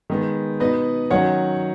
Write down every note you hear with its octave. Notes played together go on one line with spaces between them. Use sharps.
D#3 G#3 B3
B2 B3 D#4 B4 D#5
D#3 F#3 C#4 C#5 F#5